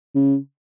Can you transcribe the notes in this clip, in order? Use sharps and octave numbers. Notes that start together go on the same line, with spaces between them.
C#3